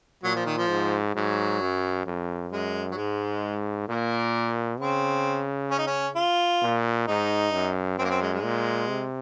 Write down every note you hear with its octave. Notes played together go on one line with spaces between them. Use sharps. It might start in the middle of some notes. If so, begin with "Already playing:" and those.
A#2 F#3
F3
D#3
F3
G#2
G#2 F#3
F#2
F2
F#2 G#3
F#3
G#2 G#3
A#2 A#3
C#3 C4
C#4
D#4
C#4
F4
A#2
G#2 D#4
F#2
F#2 C4
A#3
C4
G#3
G#3
A#2
C3